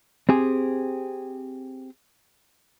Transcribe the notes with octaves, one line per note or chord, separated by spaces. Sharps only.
C4 G4 G#4